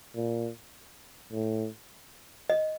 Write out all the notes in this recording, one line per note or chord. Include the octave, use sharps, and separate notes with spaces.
A#2
A2
D#5